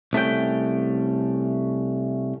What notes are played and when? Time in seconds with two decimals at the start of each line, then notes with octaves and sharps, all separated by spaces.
0.13 C2 A3 C#4 G5